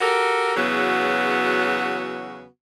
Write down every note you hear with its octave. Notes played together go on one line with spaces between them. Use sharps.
F#4 G4 A4 A#4
E2 C#3 F#3 B3 F#4